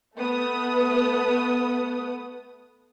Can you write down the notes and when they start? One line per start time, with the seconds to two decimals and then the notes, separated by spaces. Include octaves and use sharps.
0.17 A3 B3 D#6